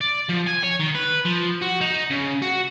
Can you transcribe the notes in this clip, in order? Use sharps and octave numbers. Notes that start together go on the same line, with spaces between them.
D5
F3
G#5
C#5
D#3
B4
F3
F#4
D#4
C#3
F#4